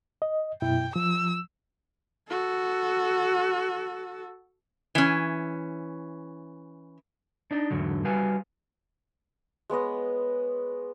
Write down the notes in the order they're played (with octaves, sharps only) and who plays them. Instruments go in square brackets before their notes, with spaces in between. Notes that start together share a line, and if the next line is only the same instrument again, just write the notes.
[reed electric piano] D#5
[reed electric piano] F#2 B2 E4 [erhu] G5
[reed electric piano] F3 [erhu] E6
[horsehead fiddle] F#4 A4
[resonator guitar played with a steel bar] E3 C#4
[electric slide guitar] D4 D#4 D#5
E2 G#2 D3 F#3
G3 F#4 B4 F5 G#5
[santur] G#3 B3 C#5 D#5